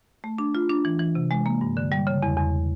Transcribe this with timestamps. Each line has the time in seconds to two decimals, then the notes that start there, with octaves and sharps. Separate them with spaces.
0.24 A3
0.38 D4
0.55 F4
0.70 D4
0.85 E3
1.00 E3
1.15 C3
1.31 G#3
1.46 A#3
1.61 G2
1.77 D3
1.92 G3
2.07 C#3
2.23 E2
2.37 E2